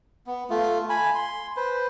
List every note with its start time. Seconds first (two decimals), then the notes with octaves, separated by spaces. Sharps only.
0.27 B3
0.50 A3 F4
0.89 G#5 B5
1.15 C6
1.57 B4 C5